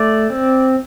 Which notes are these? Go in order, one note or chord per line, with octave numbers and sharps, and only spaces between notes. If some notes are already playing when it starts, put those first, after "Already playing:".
Already playing: A3 D5
C4